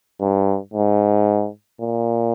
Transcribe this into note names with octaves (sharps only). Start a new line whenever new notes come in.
G2
G#2
A#2